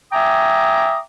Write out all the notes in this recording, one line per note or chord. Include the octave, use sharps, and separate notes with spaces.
E5 G5 G#5 A#5 D6 D#6